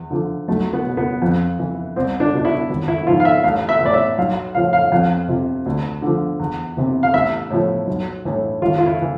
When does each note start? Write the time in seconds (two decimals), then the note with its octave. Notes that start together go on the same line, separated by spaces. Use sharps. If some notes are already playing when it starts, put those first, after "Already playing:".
Already playing: E2
0.11 D3 F3
0.48 B1 A3
0.73 B3
0.86 B2
0.97 B3
1.22 F2
1.59 E3
1.96 C2 C4
2.20 D4
2.33 B2 D4
2.45 E4
2.70 G#1
2.88 E4
3.07 G#2 F3 F4
3.20 F5
3.25 E5
3.44 A1 F5
3.69 E5
3.81 A2 E3 D5
3.94 E5
4.18 B1 F5
4.55 A2 F3 F5
4.73 F5
4.92 F2 F5
5.28 C3 F3
5.66 D2
6.02 D3 F3
6.40 E2
6.77 C3 E3
7.03 F5
7.14 A1 E5
7.51 A2 F3
7.87 B1
8.25 A2 E3
8.62 G#1 F4
8.78 F4
8.86 E4
9.02 E3